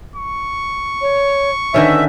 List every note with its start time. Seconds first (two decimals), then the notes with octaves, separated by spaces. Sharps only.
0.16 C#6
1.01 C#5
1.74 D3 D#3 C#4 B4 E5